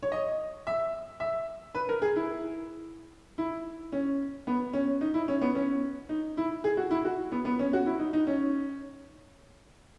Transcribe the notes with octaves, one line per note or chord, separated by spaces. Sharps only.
C#5
D#5
E5
E5
B4
A#4
G#4
E4
E4
C#4
B3
C#4
D#4
E4
C#4
B3
C#4
D#4
E4
G#4
F#4
E4
F#4
B3
B3
C#4
F#4
E4
D#4
D#4
C#4